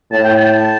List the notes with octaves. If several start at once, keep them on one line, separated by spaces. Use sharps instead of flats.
A2 A5
G5
A5